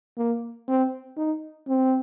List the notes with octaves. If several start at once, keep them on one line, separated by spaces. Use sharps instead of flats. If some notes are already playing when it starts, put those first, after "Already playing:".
A#3
C4
D#4
C4